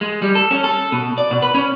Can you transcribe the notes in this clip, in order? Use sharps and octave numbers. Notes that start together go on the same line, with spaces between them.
G#3
G3
A4
C#4
A4
B2
D5
B2
B4
C#4